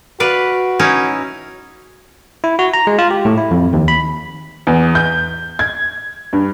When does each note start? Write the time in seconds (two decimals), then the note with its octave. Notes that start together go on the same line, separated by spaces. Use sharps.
0.20 F#4 B4 D5 F5
0.80 C#4 D#4 E4
2.44 E4
2.59 F#4
2.74 A#5
2.87 G#3
2.99 F4
3.11 G4
3.25 A2
3.38 E4
3.51 F2
3.73 D#2
3.88 B5
4.67 E2
4.95 G6
5.59 G#6
6.33 G2